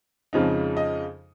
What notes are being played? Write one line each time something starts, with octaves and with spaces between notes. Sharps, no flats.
F2 C#3 F3 G#3 D#4
D#5